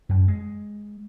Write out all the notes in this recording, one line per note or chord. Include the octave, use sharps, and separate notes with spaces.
F#2
G#3